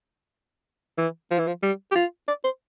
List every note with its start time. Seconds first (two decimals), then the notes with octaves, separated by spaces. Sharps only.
0.98 E3
1.31 F3
1.39 E3
1.47 F3
1.62 G3
1.91 G4
1.95 F4
2.28 D5
2.44 C5